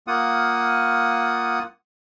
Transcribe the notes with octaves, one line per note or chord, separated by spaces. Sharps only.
A#3 F4 F#5 D#6